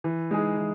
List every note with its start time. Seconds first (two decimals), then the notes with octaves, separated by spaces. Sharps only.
0.04 E3
0.31 G#3 D#4 G#4
0.57 E3